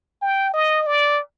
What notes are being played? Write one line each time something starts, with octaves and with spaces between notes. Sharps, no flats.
G5
D#5
D5